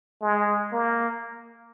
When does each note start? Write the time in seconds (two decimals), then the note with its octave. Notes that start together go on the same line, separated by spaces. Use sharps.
0.22 G#3
0.72 A#3